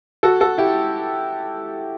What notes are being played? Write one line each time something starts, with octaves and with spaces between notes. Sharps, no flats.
F#4 A4
F#4 A4
E4 G4